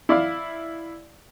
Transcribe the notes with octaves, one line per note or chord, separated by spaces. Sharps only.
E4 D5 F5